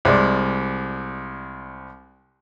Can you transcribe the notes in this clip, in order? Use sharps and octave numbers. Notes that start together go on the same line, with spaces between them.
C2 G#3 D5